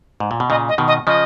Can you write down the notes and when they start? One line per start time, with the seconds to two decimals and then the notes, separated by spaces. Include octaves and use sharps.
0.20 G#2
0.31 A#2
0.40 B2
0.50 A#2 C#3 D#5
0.69 D#5
0.78 B2 D#3
0.88 D#5
1.07 C#3 F3 D#5